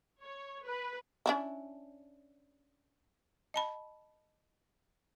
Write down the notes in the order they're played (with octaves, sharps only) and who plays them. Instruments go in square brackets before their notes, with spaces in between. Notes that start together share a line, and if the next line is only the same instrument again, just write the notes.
[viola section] C#5
B4
[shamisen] C#4 D4 E4
[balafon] D#5 A5 B5